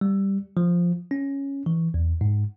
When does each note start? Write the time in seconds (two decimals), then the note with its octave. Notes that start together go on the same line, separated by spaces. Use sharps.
0.01 G3
0.57 F3
1.11 C#4
1.66 E3
1.94 E2
2.21 G#2